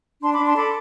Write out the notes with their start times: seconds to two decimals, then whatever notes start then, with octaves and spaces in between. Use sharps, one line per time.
0.22 D4 A5 C6
0.33 B5 D6
0.39 D4
0.45 A5 C6
0.56 A4 B5 D6